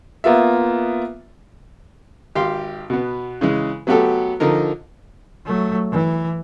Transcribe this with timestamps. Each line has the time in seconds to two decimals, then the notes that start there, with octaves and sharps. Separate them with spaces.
0.24 A#3 B3 F4 E5
2.35 G#1 G4 F5 C6
2.90 B2 B3
3.41 C#3 E3 G#3
3.87 F#3 A3 B3 F#4 G4 A4
4.40 D3 F3 D#4 A#4
5.46 F#3 A3
5.92 E3